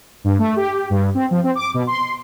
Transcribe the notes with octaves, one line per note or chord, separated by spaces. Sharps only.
G2
A3
G4
G2
C4
F3
C4
D6
B2
C6